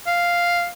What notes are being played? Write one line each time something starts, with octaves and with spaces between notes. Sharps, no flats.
F5